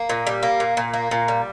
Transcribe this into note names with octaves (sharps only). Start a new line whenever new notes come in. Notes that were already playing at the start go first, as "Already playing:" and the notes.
Already playing: A#3
A#2
G3
A#3
A#2
A#2
A#3
A#2
G3